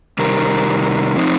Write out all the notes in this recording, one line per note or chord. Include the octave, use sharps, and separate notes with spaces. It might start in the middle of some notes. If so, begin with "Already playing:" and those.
C3 D#3 G3 A#4
F3 C4 D#4